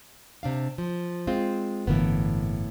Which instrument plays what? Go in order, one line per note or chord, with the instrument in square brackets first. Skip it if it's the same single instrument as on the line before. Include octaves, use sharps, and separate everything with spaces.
[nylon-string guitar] C3 D4 F5
F3
G#3 C4 F4
[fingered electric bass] G1 D3 E3 [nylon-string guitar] A2 A#3 B3